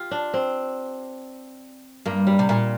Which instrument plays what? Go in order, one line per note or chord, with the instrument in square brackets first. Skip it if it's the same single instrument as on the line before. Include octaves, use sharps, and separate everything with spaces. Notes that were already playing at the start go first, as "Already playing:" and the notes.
Already playing: [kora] F4 G4
D4
C4
[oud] G2 [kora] A#3
[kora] G3
[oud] C3
[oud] A#2 [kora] A#3